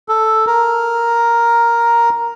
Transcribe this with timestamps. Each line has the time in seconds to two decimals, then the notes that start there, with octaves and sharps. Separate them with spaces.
0.09 A4
0.47 A#4